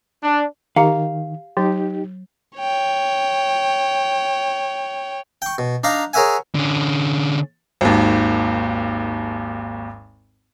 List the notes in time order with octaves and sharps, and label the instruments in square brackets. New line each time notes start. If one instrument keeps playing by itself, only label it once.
[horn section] D4
[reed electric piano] D#3 [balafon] G4 A#5 [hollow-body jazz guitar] F5
[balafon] F#3 [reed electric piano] D#4 G4
[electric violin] C#5 G5
[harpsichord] G5 C#6
B2
D4 D#4 F5 A#5
G#4 A#4 C#5 E5 F#5 G#5
[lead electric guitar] D3 C#4
[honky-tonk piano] G#1 D#2